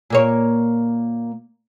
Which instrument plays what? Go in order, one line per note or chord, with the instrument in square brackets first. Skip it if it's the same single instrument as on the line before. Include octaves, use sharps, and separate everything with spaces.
[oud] A#2 A#3 C#5